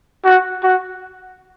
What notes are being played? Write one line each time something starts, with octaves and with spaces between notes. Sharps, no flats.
F#4
F#4